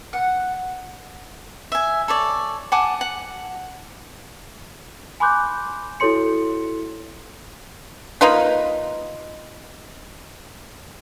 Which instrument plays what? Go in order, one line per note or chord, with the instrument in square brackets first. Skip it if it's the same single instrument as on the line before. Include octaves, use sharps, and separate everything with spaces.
[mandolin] F#5
[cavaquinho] E5 G#5
A4 C#5 D5
F#5 G#5 A5 D6
F#5
[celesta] G#5 B5 C6 D6 F#6 G6
E4 F#4 A4 C#5 C6 C#7
[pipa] A#3 D#4 F4 B4